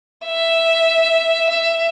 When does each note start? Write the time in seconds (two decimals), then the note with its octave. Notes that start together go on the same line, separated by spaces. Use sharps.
0.25 E5
1.50 E5